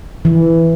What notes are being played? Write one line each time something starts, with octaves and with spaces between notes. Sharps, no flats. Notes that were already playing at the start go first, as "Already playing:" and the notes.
E3